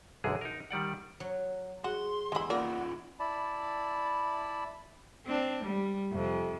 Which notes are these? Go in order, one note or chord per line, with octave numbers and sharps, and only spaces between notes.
B1 F#2 D3 G#3 G#4
D#4 A#4
D#3 G3 D5 F#5
F#3
F#4 G#4 F#5 C6
E2 G#3 E4 B5
A#3 D#4 F4 A#4 D5 F#5
E4 D5 A5 B5
C4 D4
G3
F2 C3